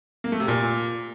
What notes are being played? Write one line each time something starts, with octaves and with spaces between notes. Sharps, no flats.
A#3
A3
C3
A#2